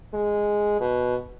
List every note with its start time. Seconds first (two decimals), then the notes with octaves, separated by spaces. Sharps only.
0.13 G#3
0.80 B2